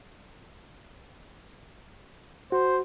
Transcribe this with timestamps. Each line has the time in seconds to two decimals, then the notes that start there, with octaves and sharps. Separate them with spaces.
2.52 F#4 C5